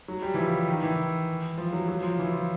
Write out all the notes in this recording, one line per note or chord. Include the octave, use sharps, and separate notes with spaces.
F#3
G3
E3
F3
D#3
E3
F3
F#3
F#3
F3
E3
F3